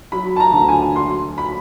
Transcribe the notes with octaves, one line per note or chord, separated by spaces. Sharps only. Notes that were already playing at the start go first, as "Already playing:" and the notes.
F#3 B5
A5
A#5
D2
G#5
F#3 C6
B5